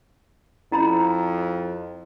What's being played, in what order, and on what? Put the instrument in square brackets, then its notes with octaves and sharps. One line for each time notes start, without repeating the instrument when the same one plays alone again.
[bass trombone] F2 [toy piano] E4 A#5 B5